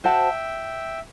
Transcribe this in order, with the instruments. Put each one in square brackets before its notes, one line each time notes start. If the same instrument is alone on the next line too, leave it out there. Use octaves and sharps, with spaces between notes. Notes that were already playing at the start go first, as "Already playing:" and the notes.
[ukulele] F#4 C5 F#5 A5 [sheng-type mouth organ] E5 G5